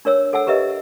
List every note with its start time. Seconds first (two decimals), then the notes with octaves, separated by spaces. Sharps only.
0.05 D4 A#4 C#5 E6
0.33 A4 F#5 G#5 E6
0.47 G4 A#4 B4 D#5 E5